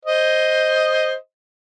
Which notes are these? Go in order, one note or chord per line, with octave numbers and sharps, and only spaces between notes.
C5 D#5